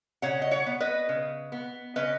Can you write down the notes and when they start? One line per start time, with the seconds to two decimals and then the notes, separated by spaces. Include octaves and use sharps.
0.22 C#3 C#5 F#5
0.42 D#5
0.51 C#5 F#5
0.66 B3
0.80 B4 D#5
1.09 C#3
1.52 B3
1.96 C#3 B4 D#5